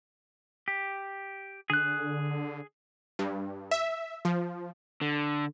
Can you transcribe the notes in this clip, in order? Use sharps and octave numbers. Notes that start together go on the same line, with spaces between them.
G4
D3 G#4 F#6
G2
E5
F3
D3